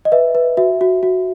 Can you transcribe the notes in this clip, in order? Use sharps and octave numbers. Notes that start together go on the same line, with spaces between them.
D#5
B4 E5
B4
F#4 E5
F#4
F#4